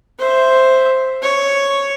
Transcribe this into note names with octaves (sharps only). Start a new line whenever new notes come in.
C5 E5
C#5